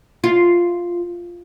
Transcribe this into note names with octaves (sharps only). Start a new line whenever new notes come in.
F4